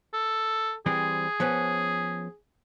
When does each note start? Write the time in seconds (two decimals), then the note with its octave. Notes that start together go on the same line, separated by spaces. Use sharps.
0.14 A4
0.86 E3 G3 C4 G#4
1.40 F3 B3 C#4